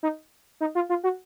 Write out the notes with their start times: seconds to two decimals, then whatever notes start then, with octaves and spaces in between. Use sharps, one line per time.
0.03 D#4
0.61 D#4
0.75 F4
0.89 F4
1.04 F#4